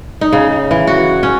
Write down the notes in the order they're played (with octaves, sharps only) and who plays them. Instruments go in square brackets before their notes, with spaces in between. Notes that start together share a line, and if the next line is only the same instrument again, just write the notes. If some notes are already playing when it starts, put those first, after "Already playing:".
[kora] D#4
C#3
E3
F#4
C#4